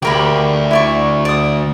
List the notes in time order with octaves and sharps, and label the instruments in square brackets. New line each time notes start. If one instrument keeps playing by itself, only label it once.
[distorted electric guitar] D2 [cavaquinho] G4 A#4 B5
[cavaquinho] E4 D5 C#6
D5 D#6